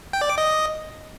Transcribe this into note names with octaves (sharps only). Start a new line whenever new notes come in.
G5
D5
D6
D#5